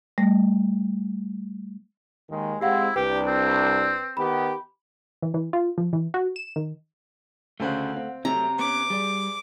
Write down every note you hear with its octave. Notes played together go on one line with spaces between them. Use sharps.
G3 A3
D#2 D#3 G#3
G#3 C4 E4 G4 F5 F#5
C2 D4 G4 B4 G5
C4
D#3 B3 G4 B5
E3
E3
F4
F3
E3
F#4
E7
D#3
D2 C#3 A3 C5 F#5
C4 F5
C3 F#3 A3 C4 A#5
B3 C#4 D6
G3 G#4 D5